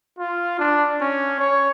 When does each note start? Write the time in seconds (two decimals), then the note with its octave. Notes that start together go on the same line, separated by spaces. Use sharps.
0.19 F4
0.59 D4
1.01 C#4
1.39 C#5